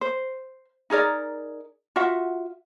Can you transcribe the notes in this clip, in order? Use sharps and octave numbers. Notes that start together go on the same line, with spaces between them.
C5
D#4 G#4 A#4 D5
F4 F#4 E5 F#5